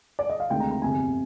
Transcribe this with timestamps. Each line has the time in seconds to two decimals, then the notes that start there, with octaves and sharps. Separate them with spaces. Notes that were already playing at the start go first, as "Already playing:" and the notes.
0.19 D5
0.29 D#5
0.40 F5
0.50 D2 C3 D#3 G#3 G5
0.60 A#5
0.71 A#5
0.82 G1 F2 C3 G#5